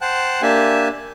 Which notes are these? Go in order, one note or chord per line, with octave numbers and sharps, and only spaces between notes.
C5 F#5 G5 A5 F#6
A#3 D4 G4 E5 G#5 A5